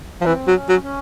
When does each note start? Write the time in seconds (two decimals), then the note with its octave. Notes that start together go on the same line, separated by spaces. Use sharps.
0.21 F3
0.26 E3 C4
0.48 F#3
0.54 C#4
0.69 F#3
0.83 C#4